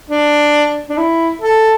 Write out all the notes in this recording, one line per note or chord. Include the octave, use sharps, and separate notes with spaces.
D4
D4
E4
A4